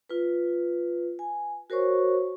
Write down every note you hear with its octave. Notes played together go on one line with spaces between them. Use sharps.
F4 B4
G#5
F#4 A#4 C5 C#5 C#6